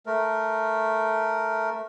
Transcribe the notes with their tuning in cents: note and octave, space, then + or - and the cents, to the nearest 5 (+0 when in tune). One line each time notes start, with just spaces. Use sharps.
A3 +0 A#4 +0